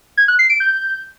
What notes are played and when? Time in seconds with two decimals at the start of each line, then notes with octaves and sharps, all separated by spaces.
0.17 G#6
0.28 F#6
0.39 C7
0.49 D7
0.60 G6